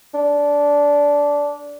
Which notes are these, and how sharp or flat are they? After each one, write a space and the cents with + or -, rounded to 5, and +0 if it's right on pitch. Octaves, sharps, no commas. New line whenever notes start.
D4 -15